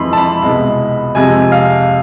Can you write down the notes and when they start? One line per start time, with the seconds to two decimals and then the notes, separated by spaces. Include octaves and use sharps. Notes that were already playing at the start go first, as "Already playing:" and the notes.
Already playing: F2 E3 G#3 B5 C6
0.13 A5
0.18 B5
0.42 C2 B2 G#3
1.15 F2 C3 G#3 G#5
1.52 F5